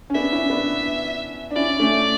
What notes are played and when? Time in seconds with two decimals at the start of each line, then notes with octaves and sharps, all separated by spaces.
0.10 C#4
0.15 B3 D4 E5
0.32 C#4 E4
0.50 B3 D4
1.51 D4
1.55 C#4 E4 D5
1.79 A3 C#4